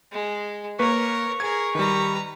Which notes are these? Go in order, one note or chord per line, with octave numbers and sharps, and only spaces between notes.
G#3
A#3 A#4 B4 C#5 C#6
G#4 A#4 G#6
D#3 G3 B4 A#5